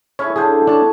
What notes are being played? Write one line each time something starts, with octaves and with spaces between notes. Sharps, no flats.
C#4 E4 G#4 C#5
D3 D4 G#4 C5
D4 C#5 A5